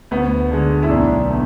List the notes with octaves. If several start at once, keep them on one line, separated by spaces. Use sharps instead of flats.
D2 B3
D3 G#3
E4
B1 D4
B2 A3